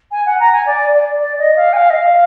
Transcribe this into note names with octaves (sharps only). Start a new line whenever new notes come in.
G#5
F#5
A#5
G#5
D5
D5
D5
D#5
F5
G#5
F5
D#5
F5